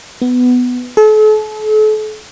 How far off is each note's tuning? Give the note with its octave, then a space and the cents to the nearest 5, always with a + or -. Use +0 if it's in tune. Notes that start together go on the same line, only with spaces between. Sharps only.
B3 +10
A4 -40